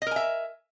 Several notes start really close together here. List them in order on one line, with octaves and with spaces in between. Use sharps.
D#5 A#4 G#5 E5